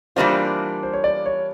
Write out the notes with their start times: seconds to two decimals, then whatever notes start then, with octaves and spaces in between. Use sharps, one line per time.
0.16 E3 G3 A#3 D4 F4 C5
0.83 C5
0.93 C#5
1.04 D5
1.26 C#5